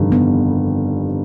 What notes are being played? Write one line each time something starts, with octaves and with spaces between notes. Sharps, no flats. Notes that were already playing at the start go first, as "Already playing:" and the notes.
Already playing: G1 F2 C3 D#3 G3
B3